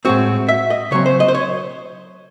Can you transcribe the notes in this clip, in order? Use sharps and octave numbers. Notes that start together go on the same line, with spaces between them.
A2 G#3 C4 F#4
E5
D#5
C#3 F#3 C4 C#5
C5
D#5
C5
C#5